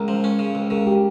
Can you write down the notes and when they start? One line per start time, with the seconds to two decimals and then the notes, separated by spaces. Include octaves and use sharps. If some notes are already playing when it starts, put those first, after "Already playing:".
Already playing: C#2 A#4
0.08 F3
0.24 C#4
0.39 C#3
0.55 C#2
0.70 C#3 A#4
0.87 G4